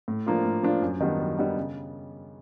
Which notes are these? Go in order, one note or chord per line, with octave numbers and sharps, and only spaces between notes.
A2
F3 A#3 D4 F4
A2
F3 A#3 D4 F4
F#2
D#3 G3 B3 D4
F#2
D#3 G3 B3 D4
C#3